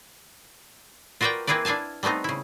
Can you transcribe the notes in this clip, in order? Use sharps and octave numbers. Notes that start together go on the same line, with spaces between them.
F4 F#4 A#4 B4 D5 G5
A#3 C4 E4 G#4 B4 D5
D4 E4 F5 G#5 A5
G3 A3 B3 C4 D#4
C#3 E4